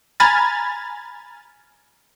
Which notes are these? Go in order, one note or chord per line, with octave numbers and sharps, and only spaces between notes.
G#5 A#5 B5 F6 G#6 A6